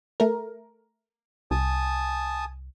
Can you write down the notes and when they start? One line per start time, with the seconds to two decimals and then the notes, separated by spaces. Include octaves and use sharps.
0.20 A3 A#4
1.51 C2 G#5 A5 D#6